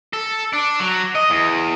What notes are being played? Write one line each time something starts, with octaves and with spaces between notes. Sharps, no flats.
A4
D4
F#3
D#5
E2